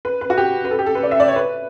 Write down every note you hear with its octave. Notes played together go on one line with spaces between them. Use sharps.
B4
B4
F#4
G4
B4
A4
G4
A4
B4
D5
E5
D5
C#5
B4